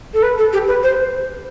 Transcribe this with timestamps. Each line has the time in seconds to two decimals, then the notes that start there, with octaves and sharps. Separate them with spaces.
0.14 A4
0.23 B4
0.38 A4
0.53 G4
0.68 B4
0.83 C5